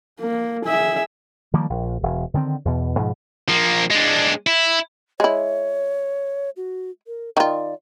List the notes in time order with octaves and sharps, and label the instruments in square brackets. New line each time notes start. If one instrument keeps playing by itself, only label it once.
[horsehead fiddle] A#3
G#4 E5
[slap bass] D#3 F3 G3 A#3
A#1
E1
D3 D#3 G3 C4
E2 B2
G#2 B2 F3
[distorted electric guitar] F3 A#3
G#3 D4
E4
[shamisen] G#3 E4 [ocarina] C#5
[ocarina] F#4
A#4
[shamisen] D#3 F4 [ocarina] D5